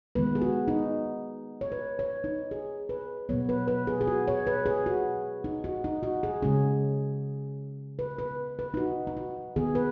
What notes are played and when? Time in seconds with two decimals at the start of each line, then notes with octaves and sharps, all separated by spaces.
0.15 D#3 G#3 B3 B4
0.35 G#4
0.42 F#4
0.68 D#4
1.61 C#5
1.72 B4
1.99 C#5
2.24 D#4
2.51 G#4
2.89 B4
3.29 B2 F#3 B3 C#5
3.49 B4
3.68 B4
3.87 G#4
4.01 G#4
4.07 F#4
4.28 C#5
4.47 B4
4.66 G#4
4.86 F#4
5.44 D#4
5.64 F#4
5.84 D#4
6.03 F#4
6.23 G#4
6.42 C#3 G#3 C#4 G#4
7.99 B4
8.19 B4
8.59 B4
8.74 D#4
8.77 F#4
9.07 D#4
9.17 F#4
9.56 D#3 B3 G#4
9.75 B4